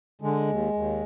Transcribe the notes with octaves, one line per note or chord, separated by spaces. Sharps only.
D3 G#3
D#2
D#2